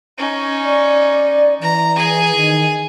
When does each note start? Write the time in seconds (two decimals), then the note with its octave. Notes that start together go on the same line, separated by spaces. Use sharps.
0.18 C#4 D#4
0.64 D5
1.61 E3 A#5
1.96 G#4 G#5
2.35 D#3